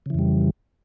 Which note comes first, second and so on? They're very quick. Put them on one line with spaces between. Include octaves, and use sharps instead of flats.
C#3 E3 F2 G3